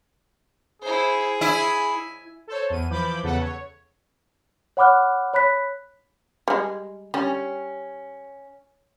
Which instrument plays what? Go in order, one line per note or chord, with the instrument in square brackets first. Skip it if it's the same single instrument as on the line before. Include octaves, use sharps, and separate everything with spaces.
[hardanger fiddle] E4 C5 [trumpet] G#4
[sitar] E4 [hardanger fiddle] G#5
[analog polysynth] A4 C5 C#5
E2 D#7
E3 F3 B5 D6 G6
E2 C#3 A4 B4 F#5
C#5
[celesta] C#5 F#5 B5 D6 F6 F#6
C#5 B5 F#6 B6
[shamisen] G3 G#3
[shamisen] G3 [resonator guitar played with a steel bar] C#4